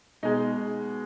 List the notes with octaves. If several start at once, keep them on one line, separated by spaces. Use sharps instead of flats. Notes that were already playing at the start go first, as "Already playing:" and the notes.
B2 G#3 D#4